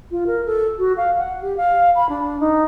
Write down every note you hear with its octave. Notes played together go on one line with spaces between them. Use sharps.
F4
A#4
A4
F#4
F5
F#5
G4
F5
B5
D4
D#4